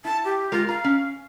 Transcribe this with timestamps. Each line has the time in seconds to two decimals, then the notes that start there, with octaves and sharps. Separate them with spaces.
0.05 E4 A5
0.25 G4
0.52 G#3 F4 A#4
0.69 F5 A#5
0.84 C#4